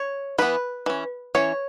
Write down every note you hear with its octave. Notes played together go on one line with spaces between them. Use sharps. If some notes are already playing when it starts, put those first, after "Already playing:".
Already playing: C#5
E3 B3 B4
E3 C#4
E3 C#4 C#5